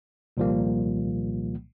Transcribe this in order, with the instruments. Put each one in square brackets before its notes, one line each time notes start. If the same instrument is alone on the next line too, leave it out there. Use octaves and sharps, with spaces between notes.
[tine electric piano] C2 A#2 D#3 F3 G3 A#3